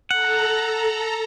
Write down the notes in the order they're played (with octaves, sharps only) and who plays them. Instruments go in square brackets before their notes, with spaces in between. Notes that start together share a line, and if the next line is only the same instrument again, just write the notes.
[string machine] A4 A#5 [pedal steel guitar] F#5